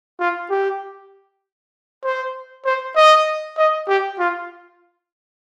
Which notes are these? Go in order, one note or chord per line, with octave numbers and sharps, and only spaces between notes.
F4
G4
C5
C5
D#5
D#5
G4
F4